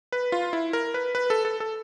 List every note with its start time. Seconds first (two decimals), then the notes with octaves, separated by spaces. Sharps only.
0.12 B4
0.32 F4
0.53 E4
0.73 A#4
0.94 B4
1.15 B4
1.30 A4
1.45 A4
1.60 A4